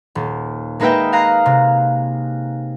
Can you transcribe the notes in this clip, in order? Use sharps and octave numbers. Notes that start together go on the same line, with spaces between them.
D#1
G#3 A#3 D#4 B4 E5 G5
F5 G#5 A#5 F#6 C7
C3